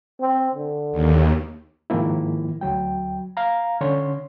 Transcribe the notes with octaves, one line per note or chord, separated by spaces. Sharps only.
C4
D3
D#2
G#2 D#3 F3 A#3 E4
D2 F#3 G5
F5 A#5
D3 C#4 C#5 C6